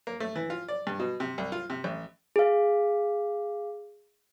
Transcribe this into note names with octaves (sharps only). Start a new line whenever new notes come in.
A#3
A3
E3
F4
D5
G2
B2
C3
C2
F4
C3
A1
G#4 F5